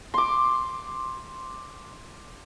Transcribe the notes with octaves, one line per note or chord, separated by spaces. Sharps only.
C6 D6